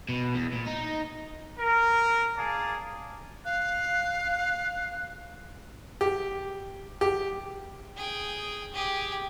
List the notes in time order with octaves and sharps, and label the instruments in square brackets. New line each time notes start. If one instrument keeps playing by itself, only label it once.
[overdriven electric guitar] B2
E2
A#2
D#4
[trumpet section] A#4
G#4 D5 F5 A5 A#5
[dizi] F5 [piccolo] F#6
[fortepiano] G4
G4
[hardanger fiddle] G#4 G5
G4 G#4